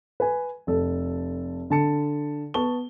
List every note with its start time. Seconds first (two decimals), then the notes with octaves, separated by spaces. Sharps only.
0.20 B4 G#5
0.67 F1 A4
1.70 D3 A5 C#7
2.54 B3 A5 C#6 G7